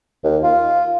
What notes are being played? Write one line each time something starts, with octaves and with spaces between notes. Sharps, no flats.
D#2
F4